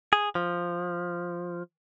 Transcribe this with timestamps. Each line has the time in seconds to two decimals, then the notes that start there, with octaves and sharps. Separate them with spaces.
0.13 G#4
0.35 F3